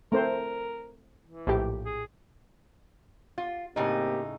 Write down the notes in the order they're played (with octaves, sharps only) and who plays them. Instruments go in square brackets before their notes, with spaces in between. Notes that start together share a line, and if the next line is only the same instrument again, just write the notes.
[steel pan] A3 C4 C5 [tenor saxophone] A#4
[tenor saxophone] E3
[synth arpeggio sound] A#1 A2 G4
[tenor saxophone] G#4
[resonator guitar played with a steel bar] F4
[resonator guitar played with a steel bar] A2 C#3 D#4 [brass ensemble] A#3 C4 G4